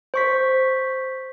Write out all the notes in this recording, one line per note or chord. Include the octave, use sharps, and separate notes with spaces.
C5 C#6 B6